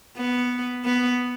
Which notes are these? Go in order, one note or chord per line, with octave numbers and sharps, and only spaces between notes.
B3
B3